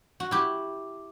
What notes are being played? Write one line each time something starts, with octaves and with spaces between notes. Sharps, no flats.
F#4
E4 G4